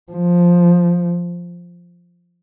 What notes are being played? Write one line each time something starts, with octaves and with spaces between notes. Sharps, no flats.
F3